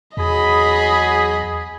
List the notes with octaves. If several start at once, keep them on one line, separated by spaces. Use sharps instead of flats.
E2 F#3 G#4 D#5 B5